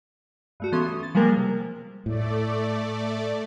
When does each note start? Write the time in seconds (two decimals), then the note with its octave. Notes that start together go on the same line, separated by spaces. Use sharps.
0.60 G2 A3 F#4
0.72 E3 B3 C#4 A4 C6 D#6
0.86 E3
1.03 A6
1.15 F3 G3 G#3 A#3 A#4
1.37 C3
2.06 A2 A3 D5